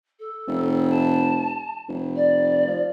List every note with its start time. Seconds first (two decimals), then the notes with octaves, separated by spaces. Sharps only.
0.19 A4
0.47 F1
0.90 A5
1.88 F1
2.16 D5
2.68 F3